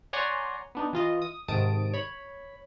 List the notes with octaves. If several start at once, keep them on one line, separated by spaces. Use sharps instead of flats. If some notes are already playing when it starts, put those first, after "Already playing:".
C#5 D5 F#5 G#5 A#5 C6
B3 D4 D#4
E3 F4 D#5
D#6
G#2 C3 D#3 A5 D#6 D7
C#5 B5